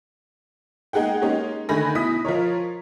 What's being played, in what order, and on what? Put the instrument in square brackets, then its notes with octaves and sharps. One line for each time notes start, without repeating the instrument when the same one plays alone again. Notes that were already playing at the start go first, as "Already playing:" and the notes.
[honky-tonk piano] G#3 A#3 D#4 G#4 F#5 G5
G#3 A#3 C#4 D#4 G4
D3 D#3 A3 G#5 B5 A#6
B2 E4 D#6 B6
F3 F4 A#4 C#5